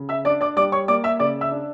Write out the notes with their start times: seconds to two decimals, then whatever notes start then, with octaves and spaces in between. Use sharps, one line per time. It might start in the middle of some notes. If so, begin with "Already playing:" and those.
Already playing: C#3
0.09 E5 E6
0.25 D4 D5 D6
0.41 D5 D6
0.57 G3 D5 D6
0.72 C#5 C#6
0.88 A#3 D5 D6
1.04 E5 E6
1.19 C#3 D5 D6
1.41 E5 E6
1.51 D4